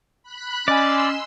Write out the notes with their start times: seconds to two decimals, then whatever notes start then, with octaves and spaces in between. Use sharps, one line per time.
0.23 B5 F#6
0.68 C#4 D5 D#5 G#5 C6 E6